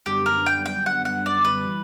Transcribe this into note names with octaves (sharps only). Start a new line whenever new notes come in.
F#2 D3 G3 B3 D4 G4
A#4
G5
G5
F#5
F#5
D5
B4
E3 G3